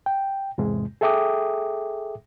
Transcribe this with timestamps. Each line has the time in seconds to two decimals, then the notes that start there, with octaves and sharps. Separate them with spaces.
0.06 G5
0.58 E2 G#2 C3 G#3
1.01 G#4 A4 E5 G5 D6 D#6